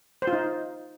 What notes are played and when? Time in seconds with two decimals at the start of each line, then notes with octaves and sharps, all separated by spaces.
0.22 C5
0.27 F4
0.33 D#4